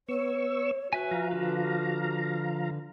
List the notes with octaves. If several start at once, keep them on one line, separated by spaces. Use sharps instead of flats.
B3 C#5 C#6 E6
F#4 B4 E5 G#5
F3 F5 A#5
D3 B4